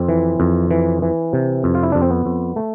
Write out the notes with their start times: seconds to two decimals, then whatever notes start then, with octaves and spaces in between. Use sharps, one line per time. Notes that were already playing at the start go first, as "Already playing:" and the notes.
Already playing: F2 C4
0.08 E3
0.40 F2
0.71 E3
1.02 E3
1.33 C3
1.64 F2
1.75 F4
1.83 E4
1.92 F2 D4
2.02 C4
2.10 B3
2.26 F2
2.56 A3